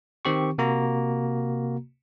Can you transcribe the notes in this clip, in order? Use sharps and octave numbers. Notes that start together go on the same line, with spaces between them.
D#3 C4 G4 C#6
C3 A#3 F#4 A#5